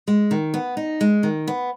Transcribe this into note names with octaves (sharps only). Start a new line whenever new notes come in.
G#3
D#3
B3
D#4
G#3
D#3
B3